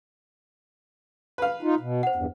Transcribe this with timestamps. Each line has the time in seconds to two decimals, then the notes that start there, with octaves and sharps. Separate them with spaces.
1.38 B4 F5
1.63 D#4 F4
1.80 B2
2.03 C5 F#5
2.15 E2 G2